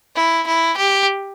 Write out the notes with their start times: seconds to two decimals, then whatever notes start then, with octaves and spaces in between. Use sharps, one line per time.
0.16 E4
0.47 E4
0.77 G4